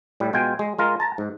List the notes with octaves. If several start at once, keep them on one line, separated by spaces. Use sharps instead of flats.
A2 G3
B2 G#3 F4 G5 G#5
G#3
G#3 F4 A#4
A5 A#5
G#2